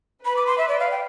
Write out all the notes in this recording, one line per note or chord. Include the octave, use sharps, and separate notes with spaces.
B4 B5
D6
C6
E5
D5
F5
G5